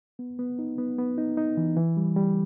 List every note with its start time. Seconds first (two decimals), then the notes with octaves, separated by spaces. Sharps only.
0.19 B3
0.39 B3
0.59 D#4
0.78 B3
0.98 B3
1.18 D#4
1.37 D#4
1.57 E3
1.77 E3
1.97 G3
2.16 G3